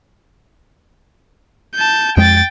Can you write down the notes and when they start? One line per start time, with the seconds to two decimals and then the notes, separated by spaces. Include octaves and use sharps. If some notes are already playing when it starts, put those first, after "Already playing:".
1.75 A5 G6
2.17 F2 G#3 G5 A6